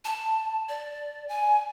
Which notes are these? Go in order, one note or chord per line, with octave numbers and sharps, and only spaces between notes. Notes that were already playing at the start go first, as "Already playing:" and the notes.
A5
D5
G#5